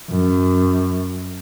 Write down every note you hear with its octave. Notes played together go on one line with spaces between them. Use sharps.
F#2